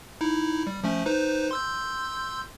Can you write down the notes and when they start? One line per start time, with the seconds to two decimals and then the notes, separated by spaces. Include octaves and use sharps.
0.21 D#4 E4
0.67 G3
0.84 F3 A3 C#4
1.06 D#4 B4 C5
1.51 C6 E6 G6